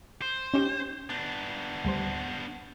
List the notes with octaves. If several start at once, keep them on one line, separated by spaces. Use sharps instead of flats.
C5
C#4 D#4 G4
B3 D4 G6 A#6
D2 G3 C5